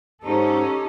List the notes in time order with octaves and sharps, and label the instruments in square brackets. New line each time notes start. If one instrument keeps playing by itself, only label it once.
[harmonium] G#2 [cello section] C#4 D#4 A4 [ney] G4